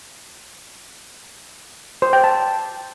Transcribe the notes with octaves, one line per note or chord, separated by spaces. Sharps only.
C5
G5
A5